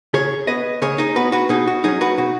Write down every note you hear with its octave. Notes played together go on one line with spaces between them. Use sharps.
C#3 G#4 C#5
B3 B4 D#5
C#3 G#4 C#5
D#4 G#4
B3 F#4 B4
F#4 B4
B2 D#4 G#4
F#4
F#3 C#4 D#4 G#4
F#4 B4
B2 F#4